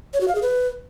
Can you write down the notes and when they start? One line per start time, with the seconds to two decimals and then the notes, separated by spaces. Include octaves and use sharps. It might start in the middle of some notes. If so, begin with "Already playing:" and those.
0.13 C#5
0.21 F#4
0.28 F5
0.35 G#4
0.42 B4